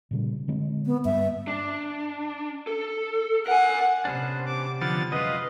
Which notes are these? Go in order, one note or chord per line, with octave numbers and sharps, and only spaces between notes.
A#2 C#3 G3
D3 G#3 C4
B3
G2 A#3 E5
D4
A4
A#4 F#5 G#5
C3 B3 C#4 D4 C5
D6
D3 F3 B3 A6
F#2 G#3 F4 B4 D#5 F5